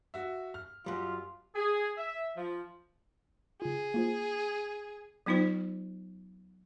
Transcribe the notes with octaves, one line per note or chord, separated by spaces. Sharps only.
F#4 E5
F6
F#2 G3 F4
G#4
E5
F3
C#3 F4 G#4
A#3 F4 C5
F#3 B3 D#4 F4 C5